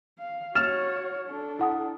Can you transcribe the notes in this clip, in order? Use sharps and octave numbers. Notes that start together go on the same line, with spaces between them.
F5
F#4 C#5 F6 A6 E7
D4 A4
E4 F#5 D#6